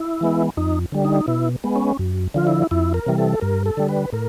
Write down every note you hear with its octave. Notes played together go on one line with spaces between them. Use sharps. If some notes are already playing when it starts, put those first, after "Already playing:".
Already playing: E4
E3 G#3 B3
F2 D#4
D3 G3
D#4
B2 E4
G#3 B3
C#4
F#2
D3 F3 F4
E4
F2 E4
A#4
C3 E3 G3
A4
G2 A#4
A4
D3 G3
B4
A2 A#4